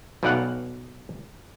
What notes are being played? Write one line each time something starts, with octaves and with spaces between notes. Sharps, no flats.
B1 B2 D#4 D5 F5 F#5